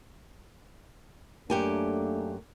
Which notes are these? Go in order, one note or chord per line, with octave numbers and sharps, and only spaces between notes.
F#2 A3 A#3 D4 G4 G#5